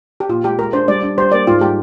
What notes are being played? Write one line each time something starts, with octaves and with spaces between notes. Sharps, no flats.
G4
A#2 F4
G#3 G4
G#3 A#4
D4 C5
G3 D5
D4
G3 C5
A#3 D5
G#2 F4
G3 G4